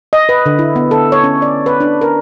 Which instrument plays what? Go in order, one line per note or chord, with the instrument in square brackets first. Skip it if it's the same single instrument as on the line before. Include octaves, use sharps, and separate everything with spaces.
[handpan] D#5
B4
D3
E4
B3
A4
C#5
C#4
D5
B4
D4
A#4